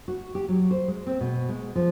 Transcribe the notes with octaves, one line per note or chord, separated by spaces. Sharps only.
F#4
G4
F#3
C5
G#3
C4
B2
G#3
F3